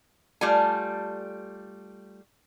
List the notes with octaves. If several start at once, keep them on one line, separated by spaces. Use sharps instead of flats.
G3 A3 F4 D5 G#5